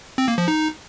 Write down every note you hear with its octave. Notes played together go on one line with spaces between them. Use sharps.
C4
A#3
F3
D#4